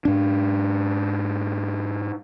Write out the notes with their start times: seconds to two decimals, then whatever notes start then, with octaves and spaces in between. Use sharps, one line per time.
0.05 G#2 D4